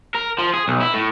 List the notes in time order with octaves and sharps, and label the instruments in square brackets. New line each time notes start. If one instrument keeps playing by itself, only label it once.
[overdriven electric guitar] A#4
F3
G#4
B1
E4
A2